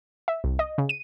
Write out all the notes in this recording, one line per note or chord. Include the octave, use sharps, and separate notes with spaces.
E5
C2
D#5
C#3
D#7